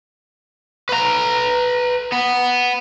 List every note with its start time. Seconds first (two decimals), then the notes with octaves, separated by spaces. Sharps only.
0.89 B4 A#5
2.12 B3